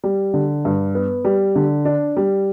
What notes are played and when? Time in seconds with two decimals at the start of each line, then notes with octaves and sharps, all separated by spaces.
0.04 G3
0.34 D3
0.65 G2
0.95 B3
1.25 G3
1.56 D3
1.85 D4
2.17 G3